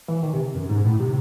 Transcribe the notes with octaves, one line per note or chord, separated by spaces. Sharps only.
E3
D#3
C3
F#2
G#2
A2
C3